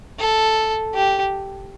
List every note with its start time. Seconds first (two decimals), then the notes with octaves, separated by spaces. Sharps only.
0.19 A4
0.95 G4